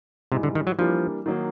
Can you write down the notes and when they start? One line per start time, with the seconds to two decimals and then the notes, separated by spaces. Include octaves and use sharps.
0.32 G#2 C3 E3 G3
0.43 D3
0.55 D#3
0.67 F#3
0.79 E3 F3 G3 A#3 D4
1.26 D#3 F#3 A#3 D#4